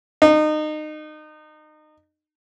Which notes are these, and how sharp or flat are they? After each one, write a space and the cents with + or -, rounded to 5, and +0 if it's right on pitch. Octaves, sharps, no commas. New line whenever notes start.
D#4 -25